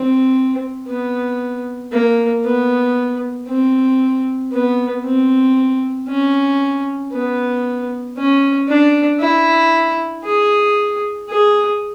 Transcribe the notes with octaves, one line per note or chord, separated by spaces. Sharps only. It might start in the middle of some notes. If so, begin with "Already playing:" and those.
Already playing: C4
B3
A#3
B3
C4
B3
C4
C#4
B3
C#4
D4
E4
G#4
G#4